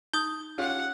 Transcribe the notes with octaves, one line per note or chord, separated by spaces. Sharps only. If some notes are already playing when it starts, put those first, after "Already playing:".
D#4 D#6 G6
C#4 F4 G4 F#5